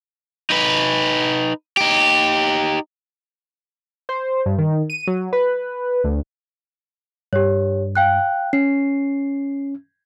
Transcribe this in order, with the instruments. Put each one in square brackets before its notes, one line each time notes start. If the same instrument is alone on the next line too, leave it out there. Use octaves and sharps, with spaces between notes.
[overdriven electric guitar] D#4 B4
D#4 G4
[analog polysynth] C5
G2
D#3
D#7
F#3
B4
D2
[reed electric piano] G2 [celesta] G4 C#5
[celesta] F5 G5 F#6
[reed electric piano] C#4 [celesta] C7